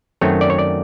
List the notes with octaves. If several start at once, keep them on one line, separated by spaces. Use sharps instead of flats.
F#2 D#3 F#3 A3 C4 C#5
D5
C#5
D5